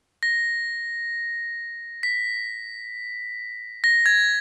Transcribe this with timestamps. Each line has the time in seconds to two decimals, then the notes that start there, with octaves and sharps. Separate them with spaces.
0.23 A#6
2.03 B6
3.84 A#6
4.06 G#6